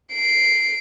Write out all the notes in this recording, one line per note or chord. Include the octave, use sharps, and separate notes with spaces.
C7 D7